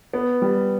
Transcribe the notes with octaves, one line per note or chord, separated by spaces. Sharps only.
B3
G3